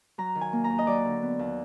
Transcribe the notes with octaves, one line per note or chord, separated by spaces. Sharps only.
F#3 A#5
D#3
G#5
A#3
A#5
D#2
D#5
F#3 D5
D3
B3
D#2